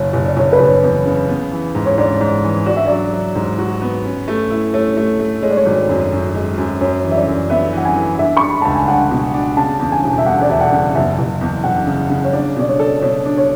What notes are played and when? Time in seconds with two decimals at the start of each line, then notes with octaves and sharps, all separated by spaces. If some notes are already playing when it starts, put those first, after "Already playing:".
Already playing: F#1 C#5
0.13 F#1
0.25 D5
0.36 F#1 C#5
0.53 B4
0.60 F#1
0.67 C#5
0.83 E2
1.06 C#3
1.29 B3
1.51 E3
1.75 G#2
1.86 C#5
1.98 G#2 D5
2.21 G#2
2.44 E3
2.66 F#4 D5
2.76 E5
2.86 F#3 D5
3.13 F#3
3.35 G#2
3.59 F#4
3.82 B3
4.05 C#4
4.28 A3
4.51 E4
4.73 A3 C#5
4.97 A3
5.20 A3
5.42 G#3 C#5
5.50 D5
5.57 C#5
5.66 G#1
5.89 F#2
6.12 F#2
6.35 G#3
6.58 F#2
6.81 F#2 C#5
7.04 E3
7.11 E5
7.15 D5
7.27 F#2
7.50 B3 E5
7.73 E3 F#5
7.85 G#5
7.96 E3
8.19 D4 E5
8.37 C#6
8.42 D4
8.49 B5
8.62 C#2 A5
8.75 G#5
8.88 D4 F#5
9.11 B2
9.34 D4
9.57 C#3 A5
9.80 E2
9.92 G#5
10.03 E1
10.18 E5
10.26 E2 F#5
10.41 D5
10.49 E1 E5
10.61 F#5
10.72 C#3
10.95 F#1 E5
11.18 F#1
11.41 E2
11.64 F#1 F#5
11.87 C#3
12.10 C#3
12.24 C#5
12.33 D4 D5
12.56 B2 D5
12.68 C#5
12.79 A4
13.02 B2 C#5
13.25 D4
13.37 C#5